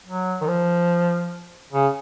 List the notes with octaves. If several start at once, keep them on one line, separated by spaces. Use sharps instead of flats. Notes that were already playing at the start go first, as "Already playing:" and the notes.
F#3
D#3
F3
C#3